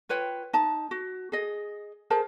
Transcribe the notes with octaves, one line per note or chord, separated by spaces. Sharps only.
F4 B4 C#5 G5
D#4 A5
F#4
G#4 D#5
G#4 A#4 C5 A5